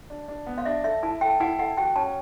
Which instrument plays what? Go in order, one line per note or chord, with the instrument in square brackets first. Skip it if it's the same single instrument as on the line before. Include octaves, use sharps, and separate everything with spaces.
[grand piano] D4
D4
B3
[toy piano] F5
[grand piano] D4 [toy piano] E5
[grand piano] A4 [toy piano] E5
[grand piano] E4 [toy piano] A5
[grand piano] A4 [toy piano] G5
[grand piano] E4 [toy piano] F#5
[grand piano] A4 [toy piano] F#5
[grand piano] F#4 [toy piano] G5
[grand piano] C#4 [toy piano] A5